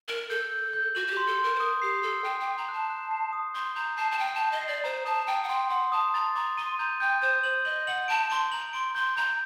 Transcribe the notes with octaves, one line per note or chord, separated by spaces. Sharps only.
A#4 F#7
A4 G6
G6
G6
F#4 F#7
F#4
G4
C6
A4
C6
A#4
C5
A#4 D#6
G4 C7
A4 C7
G5 F#6
G5
D6
A#5
A5 F#6
F#6
C7
D#6
C6 G6
A#5 G6
A5 C7
A5
G5 G6
A5
G6
D#5
C7
D5
C5 A#5
A5 D#6
G5 A#5
F#5
G5 C6
F#5 C6
A5 D#6
A#5 A6
A#5 D6
C6 D#7
A#5 G6
G5 G6
C5 G6
C5 F#7
D#5 F#7
F#5 F#7
A5 D7
C6 D7
A#5 F#7
C6 D7
C6 G6
A#5 G6